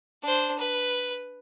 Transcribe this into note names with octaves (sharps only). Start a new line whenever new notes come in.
D4 C5
B4